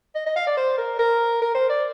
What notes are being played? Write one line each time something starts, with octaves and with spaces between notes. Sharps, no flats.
D#5
D#5
F5
D5
C5
A#4
A#4
A#4
C5
D5